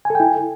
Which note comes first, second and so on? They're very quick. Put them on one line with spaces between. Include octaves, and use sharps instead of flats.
G#5 A4 G5 E4